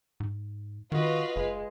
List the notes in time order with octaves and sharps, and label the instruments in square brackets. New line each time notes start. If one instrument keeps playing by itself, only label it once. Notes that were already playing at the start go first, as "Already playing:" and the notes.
[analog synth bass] G#2
[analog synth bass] D#3 [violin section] F4 B4 F5 [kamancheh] F#4 D#5
[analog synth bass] F#1 [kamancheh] G#3